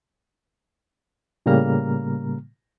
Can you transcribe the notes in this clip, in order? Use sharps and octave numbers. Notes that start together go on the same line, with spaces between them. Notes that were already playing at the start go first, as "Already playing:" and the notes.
A2 C#3 G3 A#3 A#5 F6